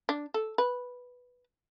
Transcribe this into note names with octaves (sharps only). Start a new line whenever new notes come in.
D4
A4
B4